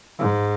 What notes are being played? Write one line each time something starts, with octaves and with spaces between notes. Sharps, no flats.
G#2